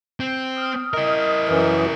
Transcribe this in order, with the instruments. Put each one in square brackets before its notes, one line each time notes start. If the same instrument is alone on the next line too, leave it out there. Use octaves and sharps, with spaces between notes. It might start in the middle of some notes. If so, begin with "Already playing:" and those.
[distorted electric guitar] C4
[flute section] D#6 F6
[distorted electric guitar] E4 A#4 [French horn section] D#5
[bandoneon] F#2 E3